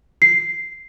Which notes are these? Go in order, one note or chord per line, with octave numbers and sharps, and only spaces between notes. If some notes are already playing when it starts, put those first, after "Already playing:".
C7